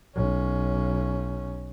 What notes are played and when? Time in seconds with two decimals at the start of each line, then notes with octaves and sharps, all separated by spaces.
0.15 B1 C#4